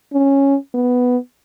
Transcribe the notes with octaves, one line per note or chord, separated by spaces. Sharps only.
C#4
B3